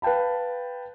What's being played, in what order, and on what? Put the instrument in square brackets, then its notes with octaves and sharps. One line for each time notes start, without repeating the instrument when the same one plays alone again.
[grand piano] B4 F5 G5 A5 B5